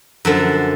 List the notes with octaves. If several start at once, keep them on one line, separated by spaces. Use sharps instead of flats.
F#2 D3 F3